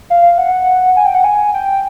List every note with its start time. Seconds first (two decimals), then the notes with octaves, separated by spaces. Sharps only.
0.10 F5
0.38 F#5
0.96 G#5
1.06 G5
1.15 F#5
1.24 G#5
1.54 G5